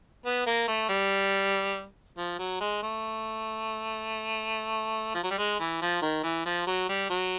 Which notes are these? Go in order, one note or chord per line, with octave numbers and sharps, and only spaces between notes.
B3
A#3
A3
G3
F3
F#3
G#3
A3
F3
F#3
G3
G#3
E3
F3
D#3
E3
F3
F#3
G3
F#3